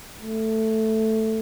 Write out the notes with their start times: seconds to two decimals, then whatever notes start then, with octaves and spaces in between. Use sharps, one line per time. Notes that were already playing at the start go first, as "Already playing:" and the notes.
0.21 A3